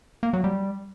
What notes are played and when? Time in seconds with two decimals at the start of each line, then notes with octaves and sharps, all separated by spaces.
0.23 A#3
0.33 F#3
0.44 G3